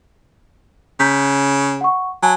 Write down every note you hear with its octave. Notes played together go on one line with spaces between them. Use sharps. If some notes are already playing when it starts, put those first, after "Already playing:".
C#3 A#5 G6 B6
F#5 C#6
F#3 G#5 A5